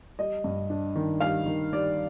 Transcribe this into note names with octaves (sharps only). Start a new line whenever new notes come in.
G3 D#5
G2
D4
D#3
G3 F5
D#3
G3 D5